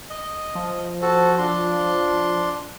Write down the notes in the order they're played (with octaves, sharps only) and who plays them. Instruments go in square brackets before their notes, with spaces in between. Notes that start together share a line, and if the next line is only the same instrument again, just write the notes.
[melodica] D#5
[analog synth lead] F3
[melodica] F#4 A4 [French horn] C5
[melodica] D4 C6 [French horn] F4